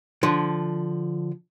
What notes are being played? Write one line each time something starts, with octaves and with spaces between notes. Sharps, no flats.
D3 F3